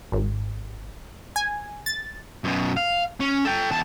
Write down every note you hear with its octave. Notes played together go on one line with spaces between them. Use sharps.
G#1
G#5
A6
F#2 B2
F5
C#4
A4 G5
E2 A5